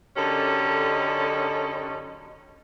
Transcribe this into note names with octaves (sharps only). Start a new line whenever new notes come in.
F#2 D3 C#4 D#4 G4 A4